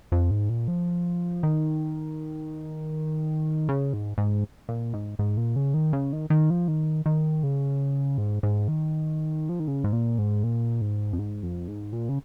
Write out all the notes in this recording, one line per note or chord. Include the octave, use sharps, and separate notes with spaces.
F2
G#2
A#2
F3
D#3
C#3
G#2
G#2
A#2
G#2
G#2
A#2
C#3
D#3
C#3
D#3
D#3
F3
D#3
D#3
C#3
G#2
G#2
D#3
F3
D#3
C#3
G#2
A#2
G#2
A#2
G#2
F2
G#2
F2
G#2
A#2
C#3